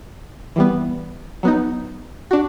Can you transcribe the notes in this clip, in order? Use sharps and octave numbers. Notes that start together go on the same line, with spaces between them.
E3 G3 B3
F#3 B3 D#4
D4 F#4